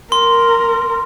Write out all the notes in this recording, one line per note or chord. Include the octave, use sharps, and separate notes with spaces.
A#4 C6